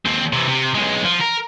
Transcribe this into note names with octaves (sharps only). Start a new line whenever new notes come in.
D#2 C4
C3 E3
C3
B1 G#3
F3
A#4